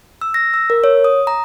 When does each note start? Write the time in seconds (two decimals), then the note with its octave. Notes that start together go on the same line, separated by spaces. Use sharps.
0.21 E6
0.34 A#6
0.54 E6
0.70 A#4
0.84 C#5
1.04 D#6
1.27 A#5